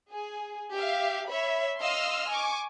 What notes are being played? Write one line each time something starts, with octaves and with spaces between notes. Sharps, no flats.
G#4
G4 E5 F5
C#5 E5 B5
D#5 F5 C6 E6 F6
G#5 C#6 D6